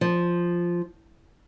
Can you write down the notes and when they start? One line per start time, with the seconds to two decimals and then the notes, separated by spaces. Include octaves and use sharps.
0.01 F3